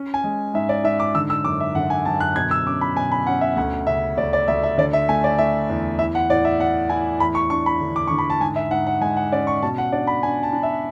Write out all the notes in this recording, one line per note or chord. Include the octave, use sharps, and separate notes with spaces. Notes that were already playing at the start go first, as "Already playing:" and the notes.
Already playing: C#4
G#5
G#3
G#2 E5
D5
G#2 E5
D6
D3 E6
E6
F#2 D6
E5
D3 F#5
G#5
F#2 A5
F#6
B2 G#6
E6
C#4 D6
B5
B2 G#5
B5
C#4 F#5
E5
D2 F#5
C#3 E5
D2 D5
D5
D2 E5
E5
D3 D5
E5
A3 G#5
D5
A3 E5
E2
E4 E5
F#5
A2 D5
E5
A2 F#5
E4 G#5
E2 B5
C#6
D4 C#6
B5
D3
D6
D3 C#6
B5
A5
G#2 G#5
E5
G#2 F#5
F#5
G#3 G#5
F#5
C#4 D5
C#6
B2 A5
F#5
D4 D5
B5
D4 G#5
A5
D4
E5